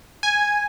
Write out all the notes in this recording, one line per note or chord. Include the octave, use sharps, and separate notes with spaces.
G#5